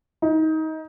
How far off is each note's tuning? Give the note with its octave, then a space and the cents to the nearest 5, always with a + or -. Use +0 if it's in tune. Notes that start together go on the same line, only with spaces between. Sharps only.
D#4 +25